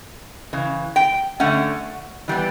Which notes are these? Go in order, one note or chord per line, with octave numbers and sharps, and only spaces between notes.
C#3 E3
G5
D3 A3 C#4 F#5
E3 G3 B3